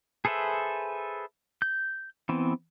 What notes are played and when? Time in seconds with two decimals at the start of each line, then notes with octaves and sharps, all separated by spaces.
0.25 G#4 A4 B4 C5 E5
1.62 G6
2.29 E3 B3 C4